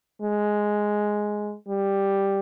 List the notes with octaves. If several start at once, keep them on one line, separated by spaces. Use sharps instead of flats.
G#3
G3